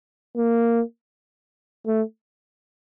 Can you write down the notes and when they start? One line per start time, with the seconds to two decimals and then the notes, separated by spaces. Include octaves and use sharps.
0.37 A#3
1.87 A3